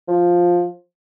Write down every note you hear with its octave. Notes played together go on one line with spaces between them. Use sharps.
F3